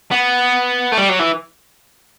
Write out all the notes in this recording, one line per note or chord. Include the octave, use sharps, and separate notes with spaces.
B3
A3
G3
F#3
E3